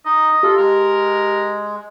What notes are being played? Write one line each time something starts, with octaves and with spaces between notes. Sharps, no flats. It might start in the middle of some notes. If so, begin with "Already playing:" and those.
D#4 D#5
F4 G4 A4
G#3 A#4